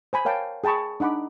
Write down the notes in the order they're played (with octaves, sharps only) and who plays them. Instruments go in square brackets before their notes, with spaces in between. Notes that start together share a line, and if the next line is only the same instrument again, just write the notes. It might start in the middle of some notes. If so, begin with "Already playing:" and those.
[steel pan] C5 G#5 B5
A#4 C#5 F5 G5 A5
G#4 G5 A5 B5 C#6
D4 D#4 F#5 B5 D6